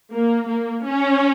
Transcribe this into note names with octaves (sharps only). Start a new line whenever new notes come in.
A#3
A#3
C#4